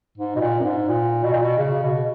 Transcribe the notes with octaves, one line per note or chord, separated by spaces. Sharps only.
G#2
B2
A#2
F#2
G#2
A#2
B2
A#2
B2
C#3
B2